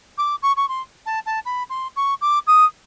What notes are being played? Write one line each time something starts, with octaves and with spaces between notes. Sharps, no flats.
D6
C#6
C#6
C6
A5
A5
B5
C6
C#6
D6
D#6